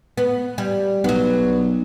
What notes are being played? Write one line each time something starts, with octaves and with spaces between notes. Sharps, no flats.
B3
G3
B1 F#3 B3